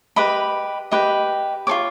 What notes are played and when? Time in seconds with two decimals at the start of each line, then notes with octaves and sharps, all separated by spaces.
0.16 G4 B4 D#5 B5
0.91 G4 B4 D#5
1.67 F4 A4 C#5 D6